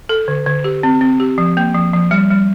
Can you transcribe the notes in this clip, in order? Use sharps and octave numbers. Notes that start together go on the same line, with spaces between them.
A4
D3
D3
G4
C4
C4
G4
F3
A#3
F3
F3
G3
G3